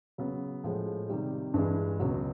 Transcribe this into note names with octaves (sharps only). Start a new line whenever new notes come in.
C#3 F#3 B3
A2 F3 G#3
C3 D#3 G3
G2 E3 G#3
C#2 B2 F#3